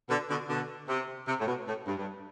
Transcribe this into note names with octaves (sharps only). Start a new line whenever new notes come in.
B2 D3
B2 D3
B2 D3
C3
C3
A2
B2
A2
G2
G2